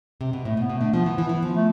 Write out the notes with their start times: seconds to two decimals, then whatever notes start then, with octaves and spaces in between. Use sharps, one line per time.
0.21 C3
0.33 B2
0.45 A2 A3
0.57 B2
0.61 B3
0.70 B2
0.77 D3 A3
0.94 F3 B3
1.06 E3
1.18 E3
1.29 E3
1.42 F3
1.55 A3